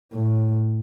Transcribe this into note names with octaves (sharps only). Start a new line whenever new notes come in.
A2